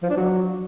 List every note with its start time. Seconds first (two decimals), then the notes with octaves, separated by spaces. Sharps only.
0.03 F3
0.10 D4
0.17 F#3